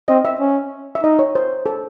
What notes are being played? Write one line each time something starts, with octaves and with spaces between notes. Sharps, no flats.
C4 D#5
E5
C#4
E5
D#4 D#5
C#5
C5
A4